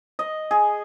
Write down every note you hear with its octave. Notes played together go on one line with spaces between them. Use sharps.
D#5
G#4